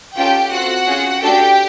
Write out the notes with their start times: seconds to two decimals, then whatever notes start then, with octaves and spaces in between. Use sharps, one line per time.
0.17 C#4 F4 G4 A4 G5
0.52 C4 F4 F#4 A4 F#5
0.86 C#4 F4 G#4
1.22 A3 D4 F#4 G4 A4 G5